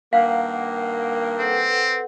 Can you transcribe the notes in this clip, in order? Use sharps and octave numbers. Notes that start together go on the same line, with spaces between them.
G2 D#3 A#3 F5 F#5
C4 A4 B4 F#5